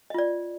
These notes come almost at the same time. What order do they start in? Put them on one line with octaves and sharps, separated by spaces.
D#5 F4 D5